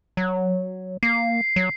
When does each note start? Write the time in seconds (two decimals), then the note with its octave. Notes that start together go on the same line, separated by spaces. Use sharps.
0.17 F#3
1.03 A#3 C7
1.56 F#3